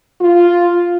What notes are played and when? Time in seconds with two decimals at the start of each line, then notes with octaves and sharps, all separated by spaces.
0.21 F4